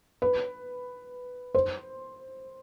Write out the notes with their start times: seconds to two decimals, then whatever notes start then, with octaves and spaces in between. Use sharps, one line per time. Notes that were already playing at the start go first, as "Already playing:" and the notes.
0.22 B4
1.55 C5